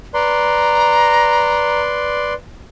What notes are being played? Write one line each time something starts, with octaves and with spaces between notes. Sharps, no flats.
B4 D5 A#5 C6